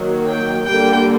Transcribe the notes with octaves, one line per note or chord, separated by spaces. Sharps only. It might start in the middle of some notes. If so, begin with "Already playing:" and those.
Already playing: D#3 F#3 A#3
G5
D3 G3 A#3 G5